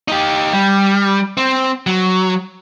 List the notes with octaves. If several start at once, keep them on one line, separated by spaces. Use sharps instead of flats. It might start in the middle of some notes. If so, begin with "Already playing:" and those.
D#4 G4
G3
C4
F#3